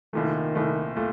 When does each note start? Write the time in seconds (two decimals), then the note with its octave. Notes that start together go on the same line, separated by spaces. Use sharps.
0.13 C2 A#2 D#3 A3
0.55 C2 A#2 A3
0.96 A#2 A3